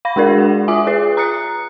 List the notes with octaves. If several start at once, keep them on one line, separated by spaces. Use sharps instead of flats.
F5 B5 A#6
G#3 D4 F#4 G#4 A#4 D5
F#5
F4 E5 G#5 D6 D#6
F4 G#4 B4 C7
A#5 D#6 F#6 C#7